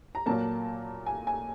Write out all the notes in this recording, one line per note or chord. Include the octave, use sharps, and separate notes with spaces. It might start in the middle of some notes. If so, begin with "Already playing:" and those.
A#5
A#2 F#3 A#3 A5
G#5
G#5